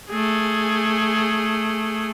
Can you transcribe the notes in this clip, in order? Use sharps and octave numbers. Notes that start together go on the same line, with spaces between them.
A3 G#4